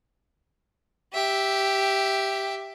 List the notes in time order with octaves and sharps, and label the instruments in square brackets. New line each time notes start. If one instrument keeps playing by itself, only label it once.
[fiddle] G4 E5